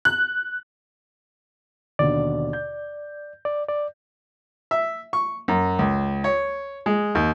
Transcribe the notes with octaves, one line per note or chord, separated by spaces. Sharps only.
F#6
D#2 B2 D3 D5
G6
D5
D5
E5
C#6
F#2
C#2
C#5
G#3
D#2